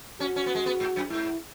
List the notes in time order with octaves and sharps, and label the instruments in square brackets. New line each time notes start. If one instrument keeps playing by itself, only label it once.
[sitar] C#4 [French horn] F#4
[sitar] C#4
B3
G#3
B3
G#2
F#2
[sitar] G#2 [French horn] E4